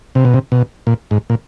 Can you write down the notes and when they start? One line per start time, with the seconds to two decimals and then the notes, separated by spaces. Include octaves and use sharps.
0.15 C3
0.25 B2
0.34 C3
0.52 B2
0.87 A#2
1.11 G#2
1.30 A#2